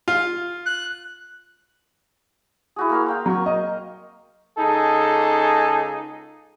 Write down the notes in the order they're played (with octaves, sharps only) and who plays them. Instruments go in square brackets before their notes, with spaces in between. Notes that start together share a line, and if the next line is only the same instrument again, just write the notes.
[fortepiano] F4
[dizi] F#6
[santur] E4 F#4 G#4
A#3 A#4 F5
F5 G5 C6
[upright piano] F#3 [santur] A#4 C#6
[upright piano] D#5
[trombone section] C#2 D#4 G#4 A4